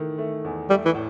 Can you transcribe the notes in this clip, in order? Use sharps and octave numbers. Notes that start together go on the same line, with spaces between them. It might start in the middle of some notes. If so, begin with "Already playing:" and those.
Already playing: D#3 E3 A3
A3
E2
G3 A3
E3
A2